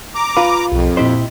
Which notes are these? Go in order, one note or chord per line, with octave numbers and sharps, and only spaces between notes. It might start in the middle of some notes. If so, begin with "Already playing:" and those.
A#5 D6
F4 B4 F5
B1 F2
A#2 C4 E4 G4 C5 D#5